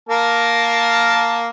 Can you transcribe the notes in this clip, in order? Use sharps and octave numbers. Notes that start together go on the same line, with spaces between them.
A#3 A#4 A5